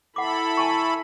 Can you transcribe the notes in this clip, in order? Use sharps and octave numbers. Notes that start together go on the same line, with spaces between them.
E4 A4 F#5 B5 D6
G#5 A5 C#6